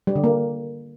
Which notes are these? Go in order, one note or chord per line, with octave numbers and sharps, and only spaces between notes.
G3
D3
A#3